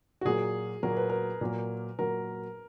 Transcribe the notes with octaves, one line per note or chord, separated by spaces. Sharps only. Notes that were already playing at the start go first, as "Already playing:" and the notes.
F#4
A#2 F#3 A#3 G#4
A#2 F#3 A#3 A#4
B4
A#4
A#2 F#3 A#3
A#2 F#3 A#3 A#4